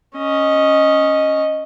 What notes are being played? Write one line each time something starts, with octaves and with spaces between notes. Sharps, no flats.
C#4 D#5